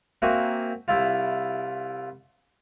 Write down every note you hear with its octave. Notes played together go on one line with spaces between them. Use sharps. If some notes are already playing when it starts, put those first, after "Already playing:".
A#3 C4 F#4 E5 G#5
C2 E4 F4